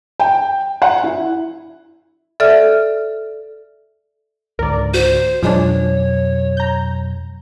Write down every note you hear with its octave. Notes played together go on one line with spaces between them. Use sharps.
G5
F#5
E4
A4 D5 E5 F6
C#2 G#2 D3 A#4 D5
F#4 C5
F2 B2 F3 F#3 G#3 D4 C#5
A#5 G6